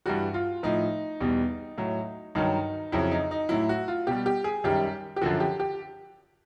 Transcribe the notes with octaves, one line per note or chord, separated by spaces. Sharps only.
G2 E3 G3 F#4
F4
A2 F3 D#4
E2 B2 G3
A2 F#3
G2 D#3 F#3 D#4
F2 C#3 F#3 E4
D#4
D#4
A2 F#3 E4
F#4
F4
B2 G3 G4
G4
G#4
F#2 D#3 G3 G4
G4
F#2 D3 F3 F#4
G4
G4